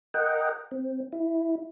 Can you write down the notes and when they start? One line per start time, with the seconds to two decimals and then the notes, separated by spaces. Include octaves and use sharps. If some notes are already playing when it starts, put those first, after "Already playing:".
0.14 A#4 D#5 F#5 G5
0.71 C4
1.12 E4